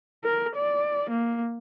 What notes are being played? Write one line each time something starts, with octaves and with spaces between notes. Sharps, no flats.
A#4
D5
A#3